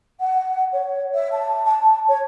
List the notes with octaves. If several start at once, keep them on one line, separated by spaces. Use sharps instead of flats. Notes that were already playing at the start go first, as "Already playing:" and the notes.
F#5
C#5
E5
A5
A5
C#5